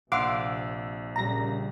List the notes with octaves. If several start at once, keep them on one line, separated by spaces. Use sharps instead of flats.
A#1 C3 F5 F#5 C6 D6 E6
A#2 C#3 G3 A#5 A#6